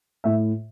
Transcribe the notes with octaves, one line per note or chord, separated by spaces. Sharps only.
A2 E5